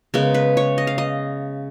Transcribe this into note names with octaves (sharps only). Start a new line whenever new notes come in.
C#3 G#3 B3 A#4
B4
C#5
D#5
F5
D#5